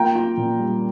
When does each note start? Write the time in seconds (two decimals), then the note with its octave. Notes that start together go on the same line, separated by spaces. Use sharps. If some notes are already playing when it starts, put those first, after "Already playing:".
Already playing: A#3 F4 G5 A#5
0.15 F4
0.37 A#2
0.59 G3